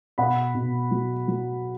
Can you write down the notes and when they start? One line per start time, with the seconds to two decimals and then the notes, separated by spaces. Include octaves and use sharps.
0.18 B2 F#5 B5
0.55 B2
0.91 F#3
1.28 F#3